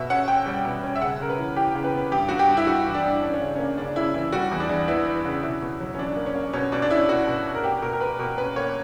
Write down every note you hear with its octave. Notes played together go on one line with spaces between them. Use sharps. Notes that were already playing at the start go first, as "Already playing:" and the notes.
Already playing: B2 E5
C#4 F#5
C#4 G5
G3
B2
C#4
E5
C#3 F#5
C#3 A#4
B4
E3
E3 G4
C#3
B4
B3
G2 G4
G2 F#4
G4
G2
E4
G2 F#4
E3
D4
G2
C#4 D4
C#4
C#3
A#3 C#4
C#3 D4
C#3 E4
E3 E4
G3 F#4
E2
D4
E2
B3 E4
B3
C#3
B2 E4
B2
F#3
C#4
F#3 D4
A#3
C#4
A#3
B2 C#4
B2 D4
D4
C#4 E4
B2 F#4
B2
B2
A#4
A#3 G4
B2 A#4
A#4
A#3 B4
B2 A#4
C#4 B4
A#3 C#5